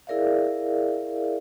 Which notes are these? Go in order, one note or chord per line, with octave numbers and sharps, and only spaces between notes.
E4 G#4 A#4 D5 E5 F5